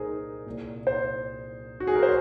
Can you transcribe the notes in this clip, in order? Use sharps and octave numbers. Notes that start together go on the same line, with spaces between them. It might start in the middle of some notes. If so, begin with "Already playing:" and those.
Already playing: C2 A#2 D#4 G#4 A#4 C5
C2 A#2
C5
F#4
G#4
A#4
C5